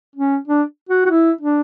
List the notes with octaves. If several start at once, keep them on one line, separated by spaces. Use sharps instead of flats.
C#4
D4
F#4
F#4
E4
D4